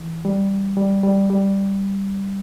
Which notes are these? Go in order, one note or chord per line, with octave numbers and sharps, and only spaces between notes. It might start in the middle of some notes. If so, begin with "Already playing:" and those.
Already playing: E3
G3
G3
G3
G3